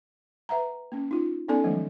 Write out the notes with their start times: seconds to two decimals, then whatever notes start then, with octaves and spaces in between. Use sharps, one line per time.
0.49 B4 E5 F#5 A#5
0.92 A#3 C#4
1.11 D#4 F4
1.48 B3 C#4 D#4 A4 D5 G#5
1.64 D#3 F3 F#3 G#3 A3 D#5